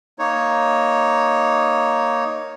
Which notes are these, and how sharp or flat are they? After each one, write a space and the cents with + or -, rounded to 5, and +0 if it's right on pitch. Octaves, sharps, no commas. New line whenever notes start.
A#3 +0 D#4 +0 C#5 +0